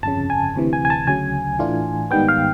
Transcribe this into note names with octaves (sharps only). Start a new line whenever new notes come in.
G1 F2 C#3 A5
G#5
D2 C3 E3
G#5
G#5
A5
D2 C#3 F#3 G#5
A2 E3 A3 D4 F4
G#2 D#3 G3 B3 G5
F5